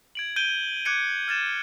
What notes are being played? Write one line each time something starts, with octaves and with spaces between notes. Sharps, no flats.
G#6 D7 F#7
G6 D7 D#7 G7
D6 F#6 G#6 C#7 D#7
F6 G#6 A6 E7